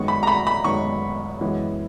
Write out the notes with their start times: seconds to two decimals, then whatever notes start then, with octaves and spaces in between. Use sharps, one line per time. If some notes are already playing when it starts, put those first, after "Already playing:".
Already playing: F#2 D#3 G#3 B3 C#6
0.08 B5
0.23 A#5
0.27 B5
0.47 B5
0.64 F#2 D#3 G#3 B3 C#6
1.41 F#2 E3 G#3 B3 E4